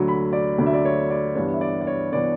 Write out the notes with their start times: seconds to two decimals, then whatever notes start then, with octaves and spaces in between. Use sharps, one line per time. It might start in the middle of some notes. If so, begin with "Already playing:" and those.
Already playing: D2 D3 F#3
0.08 B5
0.33 D5
0.58 D2 D3 F#3 D5
0.66 E5
0.74 D5
0.85 C#5
1.10 D5
1.35 G2 E3 B3 D4 C#5
1.54 E5
1.61 D5
1.81 D5
1.87 C#5
2.12 E3 B3 D4 D5